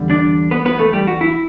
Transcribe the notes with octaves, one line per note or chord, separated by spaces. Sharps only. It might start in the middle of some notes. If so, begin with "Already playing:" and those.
Already playing: E2 D3 G3
D4 D5
B3 B4
B3 B4
A3 A4
G3 G4
F#4
E4